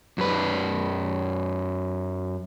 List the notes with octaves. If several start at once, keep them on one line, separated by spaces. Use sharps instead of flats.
F#2 B4